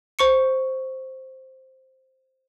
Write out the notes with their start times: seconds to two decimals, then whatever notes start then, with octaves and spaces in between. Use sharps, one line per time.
0.19 C5 C#6 C#7